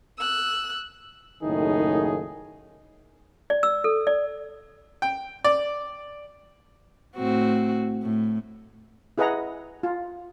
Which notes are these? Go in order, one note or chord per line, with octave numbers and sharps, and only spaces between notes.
E6 F#6
F#1 A2 D#3 D#4 G#4
D5
E6
A4
D5
G5
D5
A2 C4 F#4
A2
E4 G#4 B4 D#5 F#5 A#5
F4